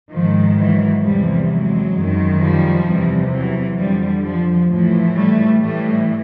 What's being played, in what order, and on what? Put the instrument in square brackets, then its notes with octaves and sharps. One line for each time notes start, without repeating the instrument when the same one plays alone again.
[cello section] G#2 D#3 F3
E3 F#3
E2 C3 E3 F3 G3
F#3 G#3
F#2 D#3
F3 G3
E2 C3 E3
E3 F#3
F2 D3 F3 G3
F3
A2 E3 F3
G3 A3
A2 E3 G3 A3